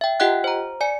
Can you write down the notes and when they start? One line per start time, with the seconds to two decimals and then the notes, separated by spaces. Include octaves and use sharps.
0.01 E5 G5
0.20 F4 G4 D#5 F#5 G5 F#6
0.44 C5 A#5
0.81 D5 G#5 C#7